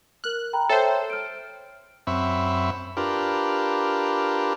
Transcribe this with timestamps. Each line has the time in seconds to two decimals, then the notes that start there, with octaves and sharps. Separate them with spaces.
0.24 A#4 F6 F#6
0.53 G5 A#5 B5
0.69 A4 C5 C#5 E5 G5
1.10 F6 D7
2.07 F#2 C4 E5 B5 C#6
2.97 D4 F4 G4 A#4 B4